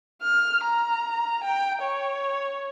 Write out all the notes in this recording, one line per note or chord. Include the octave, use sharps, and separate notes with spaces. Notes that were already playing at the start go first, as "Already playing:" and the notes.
F6
A#5
G5
C#5